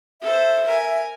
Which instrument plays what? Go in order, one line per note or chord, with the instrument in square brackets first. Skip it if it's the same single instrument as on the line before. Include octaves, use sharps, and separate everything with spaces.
[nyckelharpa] A4 C5 [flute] E5
[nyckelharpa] A#4 G#5